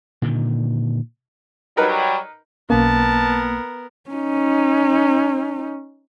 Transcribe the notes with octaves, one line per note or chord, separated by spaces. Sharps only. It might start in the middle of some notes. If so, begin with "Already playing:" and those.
A#2 D3 D#3
F#3 G3 D#4 A#4 B4
B1 A#3 B3 C#4 A#4 A5
C#4 D#4